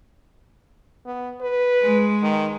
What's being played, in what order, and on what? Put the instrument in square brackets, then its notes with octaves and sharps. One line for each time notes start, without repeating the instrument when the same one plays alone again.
[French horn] B3
B4
[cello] G#3
[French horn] D#3